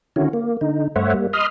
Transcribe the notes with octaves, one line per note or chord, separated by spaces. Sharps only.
D3 D#3 C#4 E4 F#4
A#3
D3 D#4
G2 A3 C5 C#5 E5 F#5
G3 A#3
D#5 B5 C6 D#6 F6